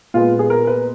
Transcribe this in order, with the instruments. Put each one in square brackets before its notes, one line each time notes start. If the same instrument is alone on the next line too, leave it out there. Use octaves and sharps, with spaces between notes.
[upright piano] A#2 G#3 B3 F4
G#4
A#4
B4